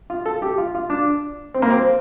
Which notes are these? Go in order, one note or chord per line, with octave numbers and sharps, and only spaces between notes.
F4
A4
G4
F4
F4
D4
C4
A#3
C4